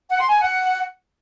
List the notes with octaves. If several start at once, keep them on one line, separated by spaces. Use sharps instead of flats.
F#5
C6
G#5
F#5